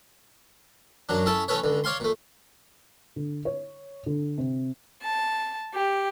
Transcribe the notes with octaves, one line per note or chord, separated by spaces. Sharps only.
F#2 F#3 D4
C#4 E4 A4 A5
E3 A3 C#4 A4 B4 C#5
C#2 D3
C#5 D5 F5 G#5 C6
A#2 A3
D3
C#5
D3
C3
A5
G4